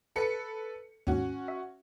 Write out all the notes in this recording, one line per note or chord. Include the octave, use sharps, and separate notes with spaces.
A4 B4 C#7
D#2 G#2 C#4 F#4
E5